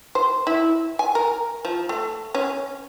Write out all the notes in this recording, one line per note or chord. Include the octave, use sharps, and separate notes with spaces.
C5
E4
G#5
A#4
F3
A3
C#4